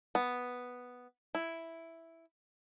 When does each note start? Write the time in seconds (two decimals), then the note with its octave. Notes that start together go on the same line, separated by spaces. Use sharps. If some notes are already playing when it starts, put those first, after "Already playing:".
0.15 B3
1.35 E4